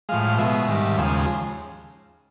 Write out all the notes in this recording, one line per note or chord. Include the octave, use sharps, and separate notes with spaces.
A2 F3 G#3 F5
F5
B2 G#3 E5
G#2 D#3 G3
D#2 C#3 F3 G#3